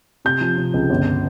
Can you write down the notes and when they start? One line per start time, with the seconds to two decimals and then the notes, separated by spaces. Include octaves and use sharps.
0.25 C3 G6
0.41 F3
0.57 C3
0.74 C#2
0.90 G1